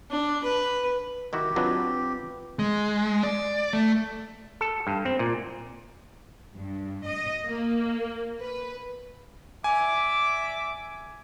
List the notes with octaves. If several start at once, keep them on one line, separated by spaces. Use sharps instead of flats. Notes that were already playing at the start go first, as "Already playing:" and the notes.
D4
B4
D#3 E4 F#4 G4
F#3 C4 D4 F4 B4 D#5
G#3
D5
A3
A4
G2
C4
A#2
G2
D#5
A#3
B4
D5 E5 G#5 D6